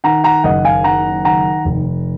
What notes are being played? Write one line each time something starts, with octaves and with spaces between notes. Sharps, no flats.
D#3 F#5 A#5
F#5 A#5
F#1 D#5 F#5
F5 G#5
D#3 F#5 A#5
D#3 F#5 A#5
F1